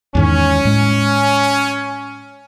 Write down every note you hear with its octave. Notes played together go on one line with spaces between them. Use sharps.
E2 G#2 D#3 C#4
A2 G#3